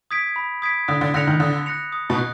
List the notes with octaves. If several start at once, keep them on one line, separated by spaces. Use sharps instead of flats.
D#6 G#6 B6 D7
B5
D#6 G#6 B6 D7
D3 D#6
D3
D3 F#6 A#6 C#7 F7
D#3
D3 D#6
F#6 A#6 C#7 F7
D#6
B2
F#6